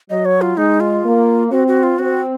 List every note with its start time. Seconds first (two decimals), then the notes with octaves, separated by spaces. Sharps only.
0.10 F#3 D#5
0.25 C#5
0.41 F4
0.57 G#3 D#4
0.80 F4
1.04 A#3
1.51 C4 F#4
1.68 F#4
1.83 F4
1.99 C4 F#4